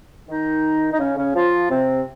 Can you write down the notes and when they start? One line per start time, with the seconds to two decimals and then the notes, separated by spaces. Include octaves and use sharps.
0.28 D#3 D#4
0.93 D#4
0.99 C#3 C#4
1.17 C#3 C#4
1.35 F3 F4
1.70 C3 C4